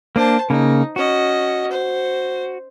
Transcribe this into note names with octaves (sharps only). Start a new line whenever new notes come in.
A#3 D4 C5 A5
C#3 A#3 D#4
C#4 F#4 D#5
C5